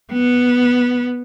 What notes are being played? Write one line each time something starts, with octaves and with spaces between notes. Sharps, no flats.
B3